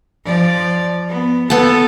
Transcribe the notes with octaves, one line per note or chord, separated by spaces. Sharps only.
F3 D5
B3
B3 A4 A5